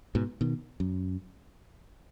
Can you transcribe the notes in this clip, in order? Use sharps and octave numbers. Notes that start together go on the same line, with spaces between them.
G#2 B2
B2 D#3
F#2